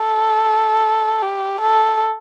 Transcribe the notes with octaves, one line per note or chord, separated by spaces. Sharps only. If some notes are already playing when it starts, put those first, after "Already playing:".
Already playing: A4
G4
A4